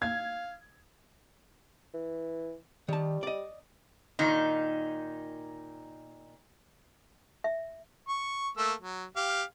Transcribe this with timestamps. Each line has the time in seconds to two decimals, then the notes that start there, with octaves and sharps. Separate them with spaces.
0.02 F5 G#6
1.94 E3
2.88 D#3 G3 A5
3.23 D5 D#5
4.19 A#2 D#3 D#4
7.44 E5
8.09 C#6
8.57 A3 A#3 E6
8.81 F#3
9.16 G4 F5